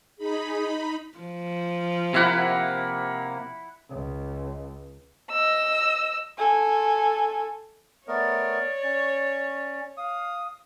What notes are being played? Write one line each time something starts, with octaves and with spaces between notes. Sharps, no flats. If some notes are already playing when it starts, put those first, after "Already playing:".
D#4 G#4 B5
F3
C3 A#3 E4 F#5 B5
C#2
D#5 E6
A4 G#5
A3 B3 A#4 C#5 D5
C#4
F5 D#6